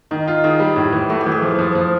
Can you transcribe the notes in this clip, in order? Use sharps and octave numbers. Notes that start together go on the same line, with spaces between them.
D#3 D#4
F4
D#3 G#4
G3
A2
E3
A3 F#4
G4
E3
G#4
F3
F3
F3